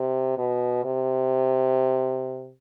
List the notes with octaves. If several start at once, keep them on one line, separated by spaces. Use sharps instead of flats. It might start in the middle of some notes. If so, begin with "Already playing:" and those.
Already playing: C3
B2
C3